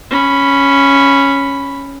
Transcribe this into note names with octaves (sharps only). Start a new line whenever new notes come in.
C#4 B5